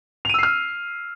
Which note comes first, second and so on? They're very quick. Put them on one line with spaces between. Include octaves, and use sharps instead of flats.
F7 D#7 E6 C7 F6